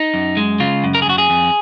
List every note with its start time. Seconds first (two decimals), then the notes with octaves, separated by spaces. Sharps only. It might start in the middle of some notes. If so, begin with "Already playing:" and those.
Already playing: D#4
0.14 F#2
0.37 G#3
0.60 C#3 F4
0.84 F#2
0.95 A#4
1.02 G#4
1.06 F#2 F#4
1.18 G#4
1.30 F2